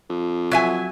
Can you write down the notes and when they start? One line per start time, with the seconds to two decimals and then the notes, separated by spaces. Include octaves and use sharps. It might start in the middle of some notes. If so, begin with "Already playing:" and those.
0.10 F2
0.51 F#3 E5 G#5